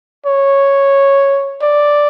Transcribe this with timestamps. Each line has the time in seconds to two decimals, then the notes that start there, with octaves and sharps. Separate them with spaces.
0.26 C#5
1.62 D5